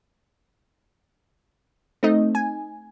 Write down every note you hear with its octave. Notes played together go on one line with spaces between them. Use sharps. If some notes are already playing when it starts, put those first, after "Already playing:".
A3 C4 D#4 D#5
G#5